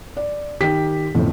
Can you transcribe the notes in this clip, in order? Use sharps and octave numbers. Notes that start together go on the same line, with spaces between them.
D5
D#3 G4 B6
G1 F2 A2